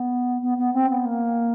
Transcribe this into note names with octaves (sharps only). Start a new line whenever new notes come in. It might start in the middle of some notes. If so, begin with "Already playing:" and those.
Already playing: B3
B3
B3
C4
B3
A#3